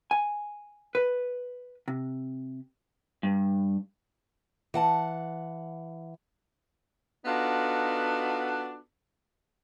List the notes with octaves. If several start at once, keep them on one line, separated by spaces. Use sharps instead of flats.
G#5
B4
C3
G2
E3 F#5 A5
B3 D4 D#4 F4 F#4 A4